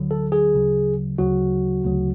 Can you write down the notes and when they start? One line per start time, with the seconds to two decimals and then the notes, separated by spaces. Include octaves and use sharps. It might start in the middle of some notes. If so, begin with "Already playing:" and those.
Already playing: D2 D3 F#3
0.11 A4
0.32 G#4
0.54 D2 C#3 F#3
1.18 D2 C#3 F#3 F#4
1.84 D2 C#3 F#3